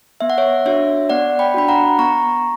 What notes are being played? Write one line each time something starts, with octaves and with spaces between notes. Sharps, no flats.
B3 E5
F#5
C#5 E5
D4 F#4 C#5 E5
B3 D5 F#5
G5 B5
D4 F#4 B5
F#5 A#5
B3 A#5 C#6